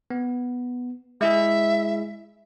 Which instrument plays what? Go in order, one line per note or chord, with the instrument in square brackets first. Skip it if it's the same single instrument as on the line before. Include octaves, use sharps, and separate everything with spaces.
[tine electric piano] B3
[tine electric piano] G#3 E4 G#4 [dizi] E5